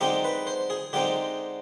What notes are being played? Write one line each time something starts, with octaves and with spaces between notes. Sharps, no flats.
D3 G#3 C4 D#4 G4
B4
C5
G#4
D3 G#3 C4 D#4 G4